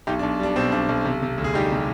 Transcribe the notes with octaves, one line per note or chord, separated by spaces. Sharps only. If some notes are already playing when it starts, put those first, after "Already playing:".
B1 D#4 G4
D4
B1
G3 D4
B2 C4
B1 D4
B1
C3
C3
D2
G#4
G3 D#4 G4
C3